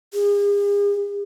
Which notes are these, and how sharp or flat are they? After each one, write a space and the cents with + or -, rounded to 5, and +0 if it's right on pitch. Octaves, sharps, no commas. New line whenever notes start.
G#4 -40